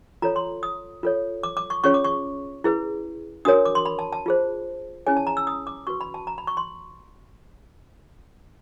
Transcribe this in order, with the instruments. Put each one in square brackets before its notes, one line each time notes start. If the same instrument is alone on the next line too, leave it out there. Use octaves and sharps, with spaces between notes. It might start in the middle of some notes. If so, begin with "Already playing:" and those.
[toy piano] F4 A4 C#5 A#5
C6
D#6
F4 A4 C#5
D6
D6
C#6
C#4 F4 G#4 C#5 C#6
D6
C#6
E4 G#4 B4
D4 F#4 A#4 C#5 D#6
D6
C6
B5
A5
A5
F4 G#4 C5
C#4 E4 G#4 C#5 G#5
A5
A#5
E6
D#6
D6
F#4 B4 C#6
B5
A5
A#5
B5
C#6
C6